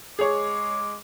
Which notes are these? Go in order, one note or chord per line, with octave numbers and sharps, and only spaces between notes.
G#3 G#4 C#5 D6